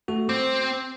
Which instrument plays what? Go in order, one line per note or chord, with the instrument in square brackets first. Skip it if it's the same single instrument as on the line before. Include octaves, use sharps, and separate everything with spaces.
[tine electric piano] A3 F#4 A4
[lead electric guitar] C4 [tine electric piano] D6